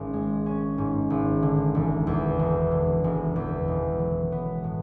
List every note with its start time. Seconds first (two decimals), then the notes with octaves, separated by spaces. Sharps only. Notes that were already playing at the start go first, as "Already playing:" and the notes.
Already playing: G#1 G#2 C#4
0.13 G#3
0.46 C#4
0.78 G#2
1.10 G#1
1.43 D3
1.75 E1
2.07 E2
2.39 E1
2.71 D3
3.04 E1
3.36 E2
3.68 E1
4.00 F#3
4.32 B3
4.64 A2